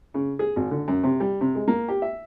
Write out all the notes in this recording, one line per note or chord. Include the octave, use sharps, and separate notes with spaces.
C#3
G#4
G#1
D3
F#2
C3
G3
C3
G#3
A#3
G4
E5